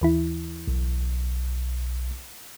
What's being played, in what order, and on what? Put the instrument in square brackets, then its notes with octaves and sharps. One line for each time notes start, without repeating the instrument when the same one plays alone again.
[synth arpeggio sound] D#2 E3 E4
[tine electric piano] B1